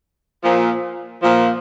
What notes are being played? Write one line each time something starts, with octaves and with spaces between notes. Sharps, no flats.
A#2 F3
A#2 F3